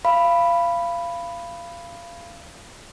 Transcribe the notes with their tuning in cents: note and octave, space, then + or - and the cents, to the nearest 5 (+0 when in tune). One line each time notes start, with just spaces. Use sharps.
F5 -25 B5 +0